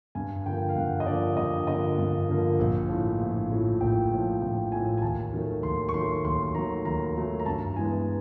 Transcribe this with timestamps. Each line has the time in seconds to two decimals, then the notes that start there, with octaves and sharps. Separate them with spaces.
0.15 G2 G#5
0.45 D3 F3 A#3 G5
0.69 F5
0.76 G2 F#5
1.00 D#5
1.06 D3 F3 A#3 D5
1.37 G2 D#5
1.67 D3 F3 A#3 D#5
1.98 G2
2.28 D3 F3 A#3
2.59 A#1
2.89 A2 F3
3.20 A#1
3.50 A2 F3
3.80 A#1 G5
4.11 A2 F3
4.41 A#1 G5
4.72 A2 F3 G#5
4.98 G#5
5.02 D#2 A5
5.33 D#3 F#3 A3
5.63 D#2 C6
5.89 C#6
5.94 D#3 F#3 A3 C6
6.25 D#2 C6
6.55 D#3 F#3 A3 A#5
6.85 D#2 A#5
7.15 D#3 F#3 A3
7.40 A#5
7.46 G2 A5
7.76 E3 G#3 B3 G#5